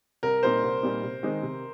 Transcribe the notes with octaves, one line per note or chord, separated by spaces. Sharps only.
C2 A#4
A#2 G3 C4 D#4 C5
C2
A#2 G3 C4 D#4
C3
D#3 G#3 C4 D#4
C3